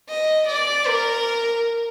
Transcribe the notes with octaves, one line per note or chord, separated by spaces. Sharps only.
D#5
D5
A#4